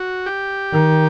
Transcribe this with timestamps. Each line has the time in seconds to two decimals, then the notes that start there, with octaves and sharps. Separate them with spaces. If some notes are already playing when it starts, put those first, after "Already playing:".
Already playing: F#4
0.26 G4
0.73 D#3